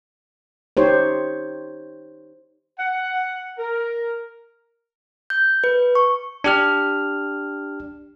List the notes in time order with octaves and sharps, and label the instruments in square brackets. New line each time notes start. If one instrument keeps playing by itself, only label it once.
[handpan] D#4 G4 C5 C#5
[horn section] F#5
A#4
[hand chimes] G6
B4
C#6
[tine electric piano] D4 G4 F6